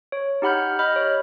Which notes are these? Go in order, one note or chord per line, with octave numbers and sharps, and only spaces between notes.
C#5
D#4 G4 F#5 B5 F6 G6
D#5 B5 F6 G6
C#5